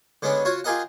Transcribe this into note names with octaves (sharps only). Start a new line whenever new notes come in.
D3 G#3 B3 C#4 D4
F4 F#4 C#5
F4 G4 G#4 A#4 D#5 F#5